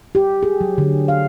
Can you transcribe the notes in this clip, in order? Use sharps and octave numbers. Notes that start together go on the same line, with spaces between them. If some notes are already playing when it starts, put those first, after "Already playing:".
G4
G#4
F#3
D3
F5